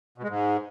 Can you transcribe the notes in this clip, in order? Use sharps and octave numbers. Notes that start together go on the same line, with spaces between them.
B2
G#3
G#2